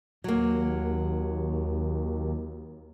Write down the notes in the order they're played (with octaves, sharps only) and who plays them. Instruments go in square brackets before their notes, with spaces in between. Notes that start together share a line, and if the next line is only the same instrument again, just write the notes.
[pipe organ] D#2 [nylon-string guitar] F#3 A#3